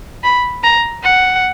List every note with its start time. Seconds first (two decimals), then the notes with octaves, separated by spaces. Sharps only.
0.23 B5
0.63 A#5
1.03 F#5